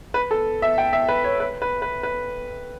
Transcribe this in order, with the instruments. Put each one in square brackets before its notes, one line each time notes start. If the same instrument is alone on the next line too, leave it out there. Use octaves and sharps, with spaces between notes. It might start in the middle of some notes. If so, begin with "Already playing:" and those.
[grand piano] B4
A4
E5
G5
E5
B4
C#5
B4
B4
B4
B4